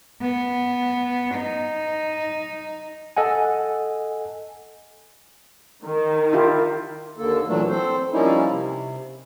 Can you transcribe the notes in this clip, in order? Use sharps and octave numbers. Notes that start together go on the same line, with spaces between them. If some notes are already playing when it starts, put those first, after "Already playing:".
B3
D#4
A4 D#5 F#5 G#5
D#3
E4 F4 G4
D#2 D3 A#3 A4
A#2 E3 F#3 A3 D4
C4 A4 C5
F3 G3 A#3 C#4 D#4 E4
C3